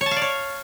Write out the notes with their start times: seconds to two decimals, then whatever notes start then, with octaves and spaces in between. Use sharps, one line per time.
0.01 C#5
0.06 A5
0.11 F5
0.16 D5
0.22 C#5